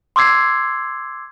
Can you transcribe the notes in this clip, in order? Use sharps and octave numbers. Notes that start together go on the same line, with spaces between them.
C6 D6 E6 G#6 C7